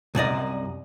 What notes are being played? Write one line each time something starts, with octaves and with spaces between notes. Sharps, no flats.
C2 F#2 D5 D#5